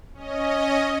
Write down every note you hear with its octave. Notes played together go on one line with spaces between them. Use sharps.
C#4 D#5